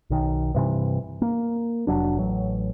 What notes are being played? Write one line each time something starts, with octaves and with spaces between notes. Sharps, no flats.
B1 D#3
G2 C3 E3
A#3
F1 F#3 D4
A1 F#3